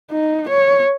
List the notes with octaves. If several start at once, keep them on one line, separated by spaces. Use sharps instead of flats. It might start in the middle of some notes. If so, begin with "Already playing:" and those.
D#4
C#5